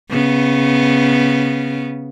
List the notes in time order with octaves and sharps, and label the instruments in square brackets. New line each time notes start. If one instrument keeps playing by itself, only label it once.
[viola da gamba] C#3 B3